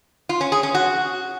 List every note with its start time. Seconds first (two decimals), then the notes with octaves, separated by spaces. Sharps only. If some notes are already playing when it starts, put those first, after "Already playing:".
0.29 F4
0.41 C#4
0.52 G#4
0.63 C#4
0.74 F#4